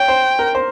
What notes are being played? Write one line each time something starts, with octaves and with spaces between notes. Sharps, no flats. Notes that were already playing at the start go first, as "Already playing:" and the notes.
Already playing: C#5 G5
C5
A#4
C5